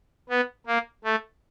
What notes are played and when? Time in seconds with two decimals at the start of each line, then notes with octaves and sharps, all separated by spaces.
0.29 B3
0.67 A#3
1.05 A3